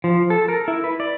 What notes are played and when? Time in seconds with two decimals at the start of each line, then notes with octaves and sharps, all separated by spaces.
0.04 F3
0.30 A4
0.48 A#4
0.68 E4
0.84 B4
1.00 D5